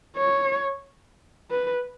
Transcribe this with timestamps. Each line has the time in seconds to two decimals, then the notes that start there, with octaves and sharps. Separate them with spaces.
0.16 C#5
1.51 B4